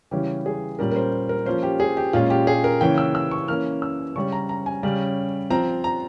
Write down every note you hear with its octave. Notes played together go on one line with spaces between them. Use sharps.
C#3 E3 G3 C#4 G4
G#4
A#2 G3 C#4 A#4
A#4
C5
A#4
F3 A#3 C#4 C5
G4
G#4
G4
A#2 G#3 C#4 F4
G4
G#4
A#4
C#3 E3 A#3 C#4 G5
E6
E6
C#6
E3 A#3 C#4 F6
E6
C#3 G3 C#4 C#6
A#5
A#5
G#5
C#3 G3 C#4
F3 C4 A#5
A#5